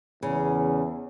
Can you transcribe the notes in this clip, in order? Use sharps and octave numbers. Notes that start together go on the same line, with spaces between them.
E2 C#3